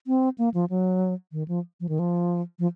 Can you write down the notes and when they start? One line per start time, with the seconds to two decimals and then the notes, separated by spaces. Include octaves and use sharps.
0.07 C4
0.38 A#3
0.54 F3
0.70 F#3
1.32 D#3
1.48 F3
1.80 F3
1.89 D#3
1.99 F3
2.59 F3